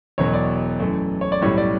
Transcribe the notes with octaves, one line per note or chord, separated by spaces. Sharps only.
E1 E2 B2 F#3 C#5
D5
F#2 E3 A3
C#5
D5
B1 A2 G3 C#5
D5